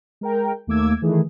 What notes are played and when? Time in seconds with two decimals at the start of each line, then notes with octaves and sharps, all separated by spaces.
0.21 G#3 A#4 G5
0.67 D#2 A3 A#3 D6 E6 G#6
1.01 D#3 E3 A3 G#4